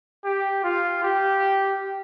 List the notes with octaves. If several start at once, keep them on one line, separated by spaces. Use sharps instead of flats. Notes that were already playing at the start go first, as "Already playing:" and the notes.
G4
F4
G4